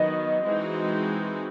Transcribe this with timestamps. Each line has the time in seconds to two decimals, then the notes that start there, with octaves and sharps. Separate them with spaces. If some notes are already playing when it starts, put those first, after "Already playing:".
Already playing: D#3 F#3 B3 D#5
0.45 E3 G#3 C4 D#4 F#4